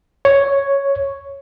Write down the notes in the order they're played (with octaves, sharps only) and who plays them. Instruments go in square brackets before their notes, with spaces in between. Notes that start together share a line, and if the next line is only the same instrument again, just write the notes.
[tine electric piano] C#5